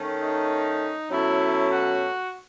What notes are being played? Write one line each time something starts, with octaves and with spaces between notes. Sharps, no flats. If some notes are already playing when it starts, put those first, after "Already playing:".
Already playing: D#3 A3 C#4
D#4
B2 F#3 A3 C#4 E4
F#4